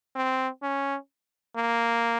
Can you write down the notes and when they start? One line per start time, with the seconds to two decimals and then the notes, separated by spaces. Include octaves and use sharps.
0.15 C4
0.62 C#4
1.56 A#3